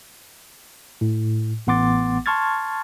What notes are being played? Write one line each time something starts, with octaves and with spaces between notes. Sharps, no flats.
A2
A1 B3 F#5 C6 D6 A6
A5 C6 C#6 F6 G#6 A6